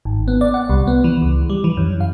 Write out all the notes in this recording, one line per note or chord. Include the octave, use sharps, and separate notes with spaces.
G#1
B3
D5
F#5
C2
B3
E3
C#2
G3
E3
F#2
F5